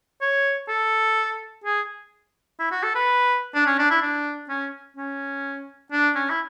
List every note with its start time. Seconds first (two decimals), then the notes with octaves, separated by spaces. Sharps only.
0.21 C#5
0.68 A4
1.64 G#4
2.59 E4
2.71 F#4
2.83 A4
2.95 B4
3.55 D4
3.67 C#4
3.79 D4
3.90 E4
4.02 D4
4.49 C#4
4.97 C#4
5.92 D4
6.15 C#4
6.30 E4